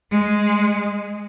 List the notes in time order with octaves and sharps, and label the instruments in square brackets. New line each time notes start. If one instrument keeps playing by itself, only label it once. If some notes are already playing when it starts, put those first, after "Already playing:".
[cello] G#3